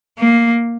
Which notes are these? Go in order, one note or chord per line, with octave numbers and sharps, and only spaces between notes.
A#3